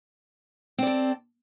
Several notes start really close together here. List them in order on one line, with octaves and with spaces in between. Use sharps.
C4 D5 A4